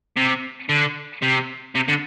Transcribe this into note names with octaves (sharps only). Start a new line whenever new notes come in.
C3
D3
C3
C3
D3